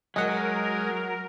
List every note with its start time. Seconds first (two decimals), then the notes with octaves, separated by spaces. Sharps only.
0.16 F#3 G#3 A#4 D#5 F#5